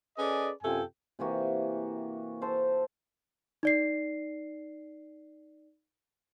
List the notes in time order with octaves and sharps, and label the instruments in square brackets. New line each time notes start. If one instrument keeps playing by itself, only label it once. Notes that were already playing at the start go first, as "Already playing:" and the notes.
[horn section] C#4 G#4 A4 B4 D5 D#5
F#2 C3 F4 A4 G5 G#5
[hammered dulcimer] C3 E3 A#3 F#4
A4 C5 F5
[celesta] D#4 D5 C7